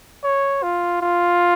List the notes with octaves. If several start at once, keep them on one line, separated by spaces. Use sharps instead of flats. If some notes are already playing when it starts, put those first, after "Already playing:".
C#5
F4
F4